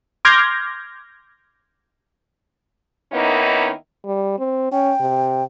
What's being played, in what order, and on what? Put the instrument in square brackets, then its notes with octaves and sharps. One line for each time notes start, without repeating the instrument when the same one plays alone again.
[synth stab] C6 D6 F6 G6 G#6 A#6
[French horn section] D#3 A#3 B3 C#4 D#4 E4
[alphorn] G3
C4
[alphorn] C#4 [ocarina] G5
[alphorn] C3